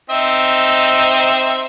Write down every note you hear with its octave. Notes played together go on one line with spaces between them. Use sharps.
C4 D#4 E5